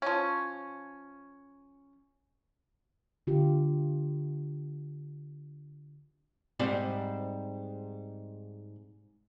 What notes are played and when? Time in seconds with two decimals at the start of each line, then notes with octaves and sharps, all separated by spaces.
0.02 F3 C#4
3.27 D3 F4 G4
6.59 G#2 G3 C4